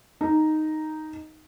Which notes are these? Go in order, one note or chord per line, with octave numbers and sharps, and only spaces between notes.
D#4